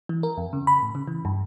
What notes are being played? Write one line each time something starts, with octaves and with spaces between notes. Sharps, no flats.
E3
A#4
F2
C#3
B5
A2
C#3
E3
G2